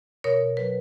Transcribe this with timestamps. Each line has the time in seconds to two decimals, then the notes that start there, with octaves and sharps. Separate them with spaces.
0.24 B2 A#4 C#5
0.57 F#3 B4